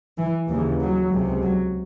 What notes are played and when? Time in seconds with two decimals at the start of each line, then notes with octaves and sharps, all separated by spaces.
0.18 E3
0.49 D#2 C#3 E3
0.80 F#3
1.11 C#2 C3
1.43 F#3